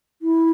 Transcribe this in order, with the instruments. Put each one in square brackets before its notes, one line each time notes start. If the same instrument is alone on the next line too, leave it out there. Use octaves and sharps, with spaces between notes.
[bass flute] E4